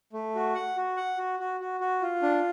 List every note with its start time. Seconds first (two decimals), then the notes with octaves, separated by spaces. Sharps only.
0.13 A3
0.35 F#4
0.55 F#5
0.77 F#4
0.97 F#5
1.18 F#4
1.40 F#4
1.60 F#4
1.80 F#4
2.02 F4
2.22 D4